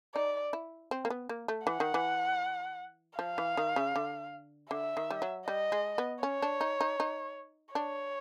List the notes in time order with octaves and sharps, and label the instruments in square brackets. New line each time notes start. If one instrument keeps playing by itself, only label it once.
[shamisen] D#4 [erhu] D5
[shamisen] E4
C4
A#3
B3
A#3
A3
[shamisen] E3 [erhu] F#5
[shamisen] D#3
E3
[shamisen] F3 [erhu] F5
[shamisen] E3
D#3
C#3
D3
[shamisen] D3 [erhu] E5
[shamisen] D#3
G3
F#3
[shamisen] G3 [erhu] D#5
[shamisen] G#3
B3
[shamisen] C#4 [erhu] C#5
[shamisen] D4
D#4
D#4
D#4
[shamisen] D4 [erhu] C#5